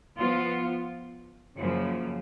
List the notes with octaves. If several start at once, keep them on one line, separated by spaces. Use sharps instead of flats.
F3 B3 F4
F#2 C#3 F3 A#3